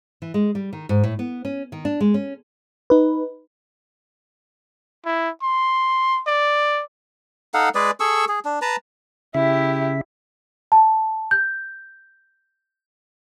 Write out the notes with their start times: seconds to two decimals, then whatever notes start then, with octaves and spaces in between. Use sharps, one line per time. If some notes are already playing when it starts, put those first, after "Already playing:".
0.22 E3
0.34 G#3
0.55 G3
0.73 D#3
0.89 G#2
1.04 A2
1.19 B3
1.45 C#4
1.72 D#3
1.85 D4
2.01 G#3
2.14 C#4
2.90 D#4 B4
5.05 E4
5.42 C6
6.26 D5
7.54 D#4 A4 F5 F#5
7.75 G#3 G#4 B4 D5
8.00 G#4 A4 C#6 E6
8.29 G#4
8.45 D4
8.62 B4 A5 A#5
9.35 C#3 E4 G4 E5
10.72 A5
11.31 G6